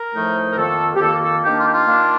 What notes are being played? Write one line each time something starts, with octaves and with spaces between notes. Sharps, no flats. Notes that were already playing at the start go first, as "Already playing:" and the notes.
Already playing: A#4
A2 F3 A3 D#4
A#4
F2 D#3 A#3 A4
G4
F2 D#3 A#3 A4
A4
D#3 A#3 D4 G4
F4
G4
F4
D#3 A#3 D4